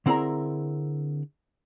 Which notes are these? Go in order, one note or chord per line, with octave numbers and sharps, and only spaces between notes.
D3 C4 E4 G#4 A#4 A#5